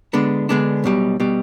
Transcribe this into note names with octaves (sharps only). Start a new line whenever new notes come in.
D3 G#3 B3 D4
D3 G#3 B3 D4
B1 B2 G3
B2 G3